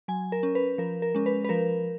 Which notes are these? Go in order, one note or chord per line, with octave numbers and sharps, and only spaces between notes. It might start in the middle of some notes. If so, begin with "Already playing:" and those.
F#3 G#5
A#4
C#4
B4
F3 A#4
A#4
G#3 C#4
B4
B4
F3 A#4